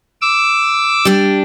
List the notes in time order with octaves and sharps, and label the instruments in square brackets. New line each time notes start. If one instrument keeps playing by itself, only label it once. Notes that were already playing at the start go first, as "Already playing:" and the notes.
[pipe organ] D6 E6
[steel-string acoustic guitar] G3 D4